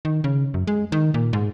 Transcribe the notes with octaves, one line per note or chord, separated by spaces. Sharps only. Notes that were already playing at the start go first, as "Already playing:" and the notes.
D#3
C#3
F#2
G#3
D#3
A#2
G#2